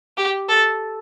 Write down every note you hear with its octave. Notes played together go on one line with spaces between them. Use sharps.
G4
A4